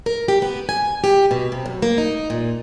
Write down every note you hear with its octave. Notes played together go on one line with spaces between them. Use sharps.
A#4
G4
B3
G#5
G4
B2
C3
F#2
A#3
D#4
A#2